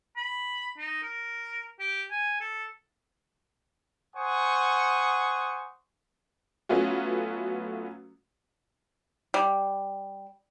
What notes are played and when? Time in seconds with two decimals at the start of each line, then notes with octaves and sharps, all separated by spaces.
0.17 B5
0.78 D#4
1.03 A#4
1.80 G4
2.11 G#5
2.41 A4
4.15 C5 F#5 G#5 C#6 D#6
6.69 F#3 A3 B3 C#4 F4 F#4
9.34 G3